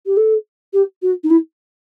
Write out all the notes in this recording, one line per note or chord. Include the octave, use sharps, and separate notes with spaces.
G4
A4
G4
F#4
D#4
E4